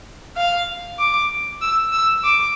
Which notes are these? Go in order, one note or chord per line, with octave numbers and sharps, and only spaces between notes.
F5
D6
E6
E6
D6